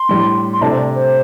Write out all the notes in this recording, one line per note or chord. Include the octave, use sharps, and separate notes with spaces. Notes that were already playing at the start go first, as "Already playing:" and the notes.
Already playing: C6
A2 G3 D4
C6
C3 A3 D4 A5
C5
D5
C5